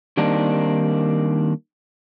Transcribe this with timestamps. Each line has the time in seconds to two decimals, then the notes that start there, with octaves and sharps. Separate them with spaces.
0.17 D#3 G3 A#3 C4 D4 D#4